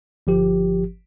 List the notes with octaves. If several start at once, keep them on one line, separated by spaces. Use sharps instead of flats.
G1 F3 G4